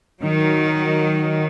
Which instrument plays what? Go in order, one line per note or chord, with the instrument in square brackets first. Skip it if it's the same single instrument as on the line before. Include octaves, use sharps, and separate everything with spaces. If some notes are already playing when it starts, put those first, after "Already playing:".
[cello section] D#3 F#3